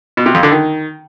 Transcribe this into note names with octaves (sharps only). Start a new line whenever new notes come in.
B2
C3
F2
D3
D#3